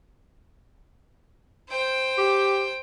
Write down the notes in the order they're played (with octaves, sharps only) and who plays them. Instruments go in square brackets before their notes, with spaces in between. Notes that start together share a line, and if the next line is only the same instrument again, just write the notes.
[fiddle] C5 G5
[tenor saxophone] G4